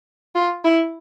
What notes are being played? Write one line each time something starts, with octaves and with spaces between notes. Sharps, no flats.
F4
E4